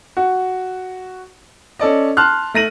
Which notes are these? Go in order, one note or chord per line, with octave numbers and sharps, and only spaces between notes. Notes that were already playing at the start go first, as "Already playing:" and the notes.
F#4
C#4 A4 D5 D#5
A5 C6 F6 F#6
A3 A#6 D#7 F#7